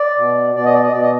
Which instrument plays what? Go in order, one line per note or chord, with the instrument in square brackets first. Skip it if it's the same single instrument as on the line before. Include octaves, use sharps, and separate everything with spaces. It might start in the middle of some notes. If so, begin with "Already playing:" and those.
Already playing: [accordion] D5
B2
B2 D5
D#5
D5
D#5
B2 D5
D#5